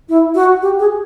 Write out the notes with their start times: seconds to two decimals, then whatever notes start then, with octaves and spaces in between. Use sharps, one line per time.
0.09 E4
0.35 F#4
0.62 G4
0.79 G#4